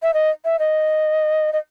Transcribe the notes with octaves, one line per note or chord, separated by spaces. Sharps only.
E5
D#5
E5
D#5
D#5